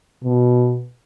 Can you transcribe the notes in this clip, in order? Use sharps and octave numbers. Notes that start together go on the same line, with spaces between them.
B2